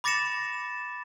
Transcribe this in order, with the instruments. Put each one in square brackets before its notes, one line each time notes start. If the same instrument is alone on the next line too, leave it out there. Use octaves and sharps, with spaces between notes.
[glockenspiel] B5 D6 A6 A#6 C#7 E7